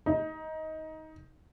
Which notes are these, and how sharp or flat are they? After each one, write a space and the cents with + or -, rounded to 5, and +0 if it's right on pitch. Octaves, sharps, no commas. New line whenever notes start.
D#4 +20